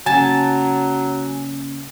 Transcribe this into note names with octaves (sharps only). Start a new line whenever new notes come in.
C#3 F#3 A#3 C#4 G#5 A5